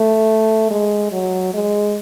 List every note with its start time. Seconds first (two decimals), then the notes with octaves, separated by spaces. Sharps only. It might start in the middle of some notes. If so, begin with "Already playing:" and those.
Already playing: A3
0.71 G#3
1.12 F#3
1.54 G#3